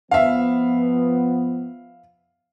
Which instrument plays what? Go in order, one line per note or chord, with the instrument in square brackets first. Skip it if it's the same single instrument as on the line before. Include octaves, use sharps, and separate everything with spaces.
[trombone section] F3 B3 [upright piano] E5 F5